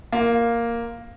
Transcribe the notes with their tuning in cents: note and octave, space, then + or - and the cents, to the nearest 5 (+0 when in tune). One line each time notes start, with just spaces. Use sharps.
A#3 +0 F4 +0